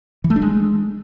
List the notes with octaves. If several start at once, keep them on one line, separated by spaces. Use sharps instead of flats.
E3
A3
D4
G#3